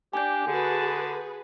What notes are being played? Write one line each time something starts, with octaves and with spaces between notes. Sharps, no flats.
D4 G4 G#5 G6
D3 F#4 G#4 B4 A5